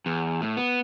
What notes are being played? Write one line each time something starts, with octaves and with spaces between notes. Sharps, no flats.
E2
A2
B3